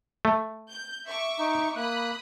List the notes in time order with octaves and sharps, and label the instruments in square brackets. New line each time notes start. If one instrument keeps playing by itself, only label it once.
[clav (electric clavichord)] A3
[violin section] G6
E5 C#6 D6
[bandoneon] D#4
[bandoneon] A#3 F#6 [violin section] B5 D#6